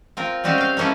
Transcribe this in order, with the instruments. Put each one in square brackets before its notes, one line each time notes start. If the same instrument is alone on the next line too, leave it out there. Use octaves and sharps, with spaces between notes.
[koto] C4 F4 A#4
G3 G#3 C4 C#4 F#4 F5
F5 G5
G#3 A#3 C#4 E4 A4